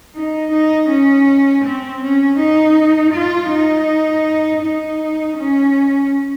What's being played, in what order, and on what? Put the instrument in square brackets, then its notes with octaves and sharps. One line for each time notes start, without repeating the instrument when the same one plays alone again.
[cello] D#4
D#4
C#4
C4
C#4
D#4
F4
D#4
D#4
C#4